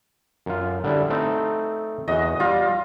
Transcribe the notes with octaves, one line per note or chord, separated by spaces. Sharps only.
F#2 F4
D3 G3 E4
A3 C4 D#4
E2 F#4 D#5
G3 F4